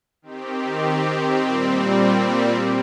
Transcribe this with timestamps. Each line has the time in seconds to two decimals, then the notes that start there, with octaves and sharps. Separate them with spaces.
0.22 D#3 C4 G4
1.36 A#2 G3 C4
2.50 A#2 A#3 G4